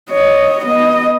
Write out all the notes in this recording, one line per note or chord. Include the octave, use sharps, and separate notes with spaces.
C#5 D#5
B3 D#5